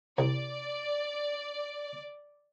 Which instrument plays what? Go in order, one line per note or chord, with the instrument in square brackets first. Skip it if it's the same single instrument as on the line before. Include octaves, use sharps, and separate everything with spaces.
[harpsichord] C2 [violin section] D5